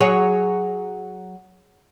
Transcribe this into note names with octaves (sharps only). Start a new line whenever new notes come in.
F#3 G#4 C#5